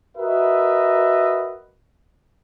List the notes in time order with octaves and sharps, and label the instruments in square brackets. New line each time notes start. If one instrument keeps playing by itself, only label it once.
[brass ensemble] F#4 A#4 B4 D#5 E5